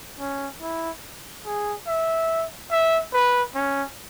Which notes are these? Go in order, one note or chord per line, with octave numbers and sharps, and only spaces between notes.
C#4
E4
G#4
E5
E5
B4
C#4